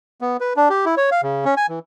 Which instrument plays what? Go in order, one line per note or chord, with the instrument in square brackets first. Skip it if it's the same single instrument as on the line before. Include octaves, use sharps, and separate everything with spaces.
[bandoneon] B3
B4
D4
G4
E4
C#5
F5
C#3
C#4
G#5
E3